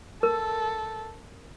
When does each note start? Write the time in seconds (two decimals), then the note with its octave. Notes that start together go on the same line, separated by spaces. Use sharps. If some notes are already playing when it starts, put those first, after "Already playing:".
0.23 A4 A#4